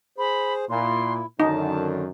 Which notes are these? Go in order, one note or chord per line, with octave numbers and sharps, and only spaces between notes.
G#4 C5 B5
A#2 E4 C6
F#2 D3 D#3 D#4 A5